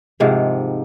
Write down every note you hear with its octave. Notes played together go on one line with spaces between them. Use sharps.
G#2 C3 D#3 F3